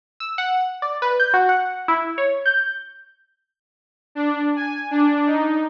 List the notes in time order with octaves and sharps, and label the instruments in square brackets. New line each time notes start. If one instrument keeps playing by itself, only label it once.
[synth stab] E6
F#5
D5
B4
G6
F#4
F#5
E4
C#5
G6
[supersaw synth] D4
G#5
D4
D#4